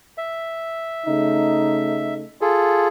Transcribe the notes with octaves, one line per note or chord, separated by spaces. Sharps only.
E5
C#3 A3 D#4
F4 G#4 A4